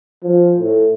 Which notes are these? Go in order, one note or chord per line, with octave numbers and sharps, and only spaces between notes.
F3
A2